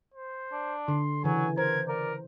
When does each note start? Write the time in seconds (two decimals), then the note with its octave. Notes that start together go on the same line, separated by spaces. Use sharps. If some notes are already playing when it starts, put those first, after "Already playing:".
0.14 C5
0.52 D4
0.88 D3 C6
1.24 C#3 E3 F#3 G#5
1.58 A#4 C5 G#6
1.88 A#4 D5